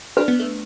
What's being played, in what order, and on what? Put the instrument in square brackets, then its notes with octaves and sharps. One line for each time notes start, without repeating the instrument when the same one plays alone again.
[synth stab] D4 [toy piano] B4
[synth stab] B3
A3